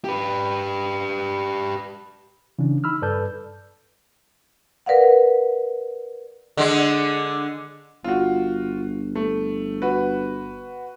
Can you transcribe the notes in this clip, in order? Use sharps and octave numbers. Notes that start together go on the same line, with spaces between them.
G4 B4
C#3 E3 C#4 D4
D#4 B5 E6 F6
G2 A4 B4 D5 A5 G6
A#4 B4 D5 F5 F#5
D3 G#3
G1 F4 F#4
A3
F#4 B4